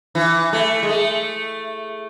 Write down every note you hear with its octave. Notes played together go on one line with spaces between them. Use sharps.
E3
A3
G#3
A3